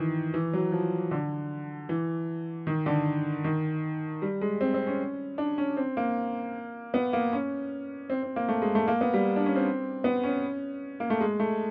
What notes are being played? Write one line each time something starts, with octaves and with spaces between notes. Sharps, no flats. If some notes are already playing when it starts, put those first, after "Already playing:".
Already playing: D#3 E3
E3
F#3
F3
D3
E3
D#3
D3
D#3
G3
G#3
C4
C4
C#4
D4
C#4
C4
A#3
B3
A#3
C#4
C4
C4
A#3
A3
G#3
A3
A#3
B3
G3
D4
C#4
C4
B3
C#4
A#3
A3
G#3
A3